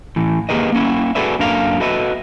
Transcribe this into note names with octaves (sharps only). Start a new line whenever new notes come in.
A2 E3
A#3 G4 G#4 A#4 B4 D#5
A#3 C#4 E4
F#4 G#4 A4 B4 D5 E5
F#2 A#3 D4 A4 A#4 F5
F#4 A4 B4 D#5 E5